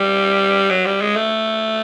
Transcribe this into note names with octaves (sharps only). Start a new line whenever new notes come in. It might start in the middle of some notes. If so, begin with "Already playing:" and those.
Already playing: G3
F#3
G3
G#3
A3